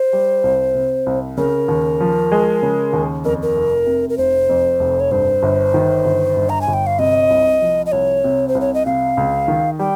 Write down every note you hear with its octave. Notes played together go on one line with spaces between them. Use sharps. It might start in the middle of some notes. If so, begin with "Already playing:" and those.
Already playing: C5
G3
C2
C3
C2
C#3 A#4
D#2
F3
G#3
C#3
D#2
F2 A#4
A#4
F1
C3
A#4
F1 C5
F2
F1
C#5
G2 C5
G1
D#3
G1
G2
A#5
G#5
G1
G5
F5
C3 D#5
C2
F3
D#5
C2 C#5
C3
C5
C2
C#5
D#5
C3 F5
C#2
D#3
G3 G5